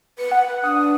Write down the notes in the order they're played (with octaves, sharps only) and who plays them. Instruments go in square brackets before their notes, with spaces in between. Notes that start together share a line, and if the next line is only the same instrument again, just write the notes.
[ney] B4 [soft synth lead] C#7
[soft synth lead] F#5
[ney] D4 [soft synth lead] D#6